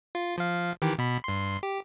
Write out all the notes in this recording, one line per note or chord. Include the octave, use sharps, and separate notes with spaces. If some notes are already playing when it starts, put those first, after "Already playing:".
F4
F3 F5
D#3 E3 G4
B2 B5
G2 C6
G4